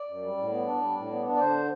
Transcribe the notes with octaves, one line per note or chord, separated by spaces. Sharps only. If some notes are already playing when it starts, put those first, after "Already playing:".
Already playing: D5
F#2
G3
A2
B3
D4
G3
A2
B3
D4
D5
D3 C5